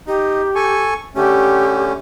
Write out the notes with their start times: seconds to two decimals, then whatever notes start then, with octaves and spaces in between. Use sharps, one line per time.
0.07 D#4 G4
0.55 A4 G#5 C#6
1.16 D3 A3 C#4 G4